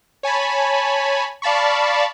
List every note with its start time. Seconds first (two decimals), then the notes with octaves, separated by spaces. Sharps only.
0.23 C#5 G#5 A5 B5
1.42 D5 F5 A5 B5 C#6